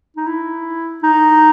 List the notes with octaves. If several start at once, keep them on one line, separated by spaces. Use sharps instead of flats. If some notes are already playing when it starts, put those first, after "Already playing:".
D#4
E4
D#4